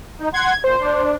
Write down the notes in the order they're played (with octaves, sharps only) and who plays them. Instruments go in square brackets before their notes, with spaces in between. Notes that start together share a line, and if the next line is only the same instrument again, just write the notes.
[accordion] D#4
[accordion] F#5 C6 [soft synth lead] G#6
[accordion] A#2 [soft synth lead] C5
[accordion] D4